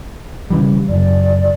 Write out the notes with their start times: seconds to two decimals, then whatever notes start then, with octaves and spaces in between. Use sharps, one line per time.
0.50 C#3 E3 G3
0.89 F#1 D5